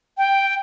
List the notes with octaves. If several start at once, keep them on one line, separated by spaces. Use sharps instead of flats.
G5